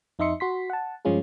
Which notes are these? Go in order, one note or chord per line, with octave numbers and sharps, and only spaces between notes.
F2 D#4 D#5 E5 C6 C#7
F#4 C6 B6
F#5 A5
G2 F3 G#3 C#4 F4 G#4